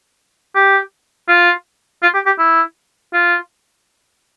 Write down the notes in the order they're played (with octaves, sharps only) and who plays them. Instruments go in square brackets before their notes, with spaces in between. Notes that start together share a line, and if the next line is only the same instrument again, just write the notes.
[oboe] G4
F4
F4
G4
G4
E4
F4